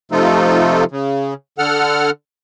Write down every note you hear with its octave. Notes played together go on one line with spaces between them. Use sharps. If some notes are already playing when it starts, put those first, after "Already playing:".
C3 F3 A3 D#4 F4 A4
C#3
D3 A4 F#5 F6